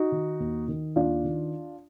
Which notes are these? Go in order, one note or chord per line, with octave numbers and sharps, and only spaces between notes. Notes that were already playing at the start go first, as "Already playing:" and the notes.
Already playing: D#4 F#4
D#3
D#2
D#3
D#2 D4 F4
D#3